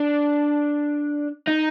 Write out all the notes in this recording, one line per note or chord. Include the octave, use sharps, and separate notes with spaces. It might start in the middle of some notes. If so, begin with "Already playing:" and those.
Already playing: D4
D#4